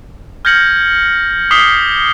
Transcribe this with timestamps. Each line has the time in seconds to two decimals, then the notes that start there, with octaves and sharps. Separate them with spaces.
0.45 F6 G6 G#6 A#6 C#7 F#7
1.51 D6 D#6 B6 C7 G7